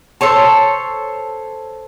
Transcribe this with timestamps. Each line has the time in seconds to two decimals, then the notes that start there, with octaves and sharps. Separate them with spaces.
0.21 A4 C5 C#5 A5